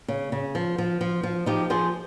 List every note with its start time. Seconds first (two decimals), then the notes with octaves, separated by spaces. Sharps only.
0.08 C#3
0.32 C#3
0.55 F3
0.78 F3
1.01 F3
1.23 F3
1.46 F3 D#4 G4
1.70 F3 G#4 C5